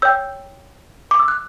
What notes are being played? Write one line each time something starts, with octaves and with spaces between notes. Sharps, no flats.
C#5 G5 E6 G6
D6
E6
F#6